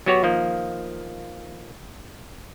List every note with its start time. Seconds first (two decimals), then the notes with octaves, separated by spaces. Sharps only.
0.06 F#3 B3 F#4 G4 C#5
0.23 D#3 F3 A#3